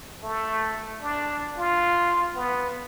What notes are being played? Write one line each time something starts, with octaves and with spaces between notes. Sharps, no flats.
A3
D4
F4
B3